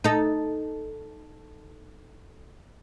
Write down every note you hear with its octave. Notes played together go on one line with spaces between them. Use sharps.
D#4 A4